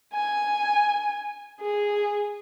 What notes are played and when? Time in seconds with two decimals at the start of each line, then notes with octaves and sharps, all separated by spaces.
0.14 G#5
1.60 G#4